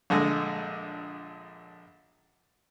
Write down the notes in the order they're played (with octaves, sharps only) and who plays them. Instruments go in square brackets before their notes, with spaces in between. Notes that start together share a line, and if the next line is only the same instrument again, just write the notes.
[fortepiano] A#1 D3 G#3